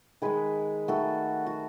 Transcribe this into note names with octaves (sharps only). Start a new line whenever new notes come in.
D#3 G#3 G#4 B4
D#3 A3 F#4 A4
F#4